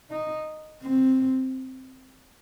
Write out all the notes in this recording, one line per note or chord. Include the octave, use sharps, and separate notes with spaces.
D#4
C4